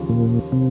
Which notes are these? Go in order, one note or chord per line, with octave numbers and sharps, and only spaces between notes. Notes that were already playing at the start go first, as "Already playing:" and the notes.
Already playing: D#2 C#3 F3
A#2
C3